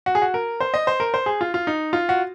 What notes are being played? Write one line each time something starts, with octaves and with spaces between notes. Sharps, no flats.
F#4
G#4
F#4
A#4
C5
D#5
C5
A#4
C5
G#4
F4
F4
D#4
F4
F#4